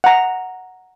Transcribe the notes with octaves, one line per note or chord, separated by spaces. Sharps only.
F#5 A#5